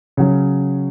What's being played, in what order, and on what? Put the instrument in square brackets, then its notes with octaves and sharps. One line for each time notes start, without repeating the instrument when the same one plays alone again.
[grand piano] C#3 F#3 C#4